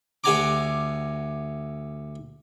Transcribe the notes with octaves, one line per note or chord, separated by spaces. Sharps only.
D2 G4 F#5 G#5 A#5 D6